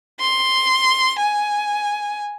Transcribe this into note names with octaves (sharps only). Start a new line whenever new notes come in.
C6
G#5